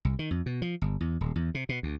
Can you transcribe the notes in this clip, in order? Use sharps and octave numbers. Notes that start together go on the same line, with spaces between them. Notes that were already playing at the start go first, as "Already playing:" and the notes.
C2
D#3
F2
B2
F3
G1
E2
D#1
E2
C3
B2
D2